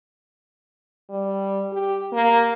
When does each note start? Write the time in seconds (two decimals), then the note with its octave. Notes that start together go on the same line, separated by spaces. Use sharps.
1.10 G3
1.73 G4
2.13 A#3